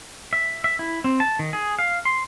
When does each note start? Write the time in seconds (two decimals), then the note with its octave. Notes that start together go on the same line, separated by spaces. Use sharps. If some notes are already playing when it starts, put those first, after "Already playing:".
0.33 E5
0.64 E5
0.79 E4
1.04 C4
1.20 A5
1.39 D#3
1.53 G#4
1.79 F5
2.05 C6